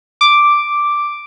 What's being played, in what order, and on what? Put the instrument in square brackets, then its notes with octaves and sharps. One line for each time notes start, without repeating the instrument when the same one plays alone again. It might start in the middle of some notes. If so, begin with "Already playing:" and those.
[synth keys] D6